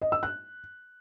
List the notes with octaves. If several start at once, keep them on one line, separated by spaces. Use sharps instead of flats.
D#5
E6
F#6